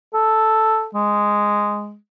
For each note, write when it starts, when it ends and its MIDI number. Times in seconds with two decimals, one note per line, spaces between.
0.14 0.87 69
0.95 1.96 56